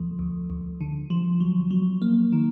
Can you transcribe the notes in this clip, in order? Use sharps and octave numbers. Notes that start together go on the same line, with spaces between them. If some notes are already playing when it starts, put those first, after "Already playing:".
Already playing: D2 F3
D2
D2
D3
F3
F#3
F#3
A#3
D#3